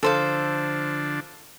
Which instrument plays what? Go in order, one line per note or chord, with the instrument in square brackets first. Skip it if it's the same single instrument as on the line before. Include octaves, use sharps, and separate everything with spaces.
[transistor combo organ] D3 F3 D4 [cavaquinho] A4 C5 F5